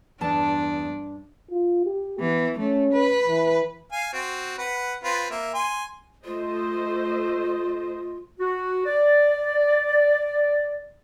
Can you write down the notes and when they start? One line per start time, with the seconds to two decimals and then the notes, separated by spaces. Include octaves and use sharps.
0.21 E2 G2 D4 A5
1.51 F4
1.85 G4
2.20 E3 B3
2.59 A3 C#4
2.93 B4
3.28 E3
3.92 F5 G#5
4.13 C4 F#4
4.58 B4 F#5
5.04 C4 F4 B4
5.31 A#3 E5
5.54 G#5 C6
6.25 A3 F4 C5 D#5
8.39 F#4
8.85 D5